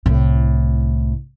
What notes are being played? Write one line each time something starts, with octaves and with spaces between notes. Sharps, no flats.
C2 A2